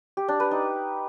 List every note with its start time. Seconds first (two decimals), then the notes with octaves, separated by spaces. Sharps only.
0.17 G4
0.28 D4
0.40 B4
0.51 D#4